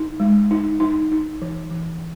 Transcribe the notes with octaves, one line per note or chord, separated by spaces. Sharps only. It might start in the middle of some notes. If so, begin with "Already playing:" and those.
Already playing: D#4
G#3
D#4
D#4
D#4
E3
E3